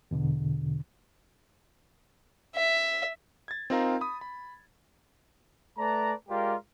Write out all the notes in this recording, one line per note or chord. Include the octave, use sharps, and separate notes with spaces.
E2 B2 D3
E5
G#6 A6
C4 D#4 F4 A#4 F5 A#5
B5 D#6
B5
A3 B4 D5 A5 A#5
G#3 F4 G4 A#4 D5 F5